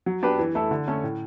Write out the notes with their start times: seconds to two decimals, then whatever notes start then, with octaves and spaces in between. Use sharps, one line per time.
0.06 F#3
0.23 B3 D4 G4 B4
0.39 E3
0.55 A3 E4 A4
0.71 D3
0.88 A3 C#4
1.04 A2